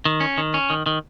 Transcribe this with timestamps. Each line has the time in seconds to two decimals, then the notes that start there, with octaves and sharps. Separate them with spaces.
0.05 D#3
0.20 C#4
0.38 D#3
0.54 C#4
0.70 D#3
0.86 D#3